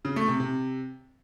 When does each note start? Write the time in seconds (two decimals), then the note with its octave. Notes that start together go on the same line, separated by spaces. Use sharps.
0.05 C#3
0.16 A3
0.28 C3
0.40 C3